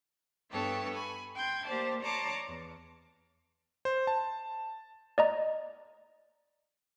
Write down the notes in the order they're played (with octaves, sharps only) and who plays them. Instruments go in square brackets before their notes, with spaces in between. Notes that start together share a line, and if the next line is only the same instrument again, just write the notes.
[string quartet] G2 B3 A4 C#5 G5 A5
G#5 B5
G5 C6 G6 G#6
A#3 G4 C5 D5 A5
C#5 D5 A5 A#5 C6 D6
E2
[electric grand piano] C5
A5
[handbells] D5 D#5 A#5